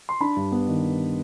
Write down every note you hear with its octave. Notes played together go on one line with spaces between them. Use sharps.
C6
D4 B5
G2
B3
D#3